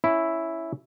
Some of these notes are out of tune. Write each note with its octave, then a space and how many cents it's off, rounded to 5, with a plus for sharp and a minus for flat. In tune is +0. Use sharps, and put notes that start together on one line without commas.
C#4 +0 E4 +0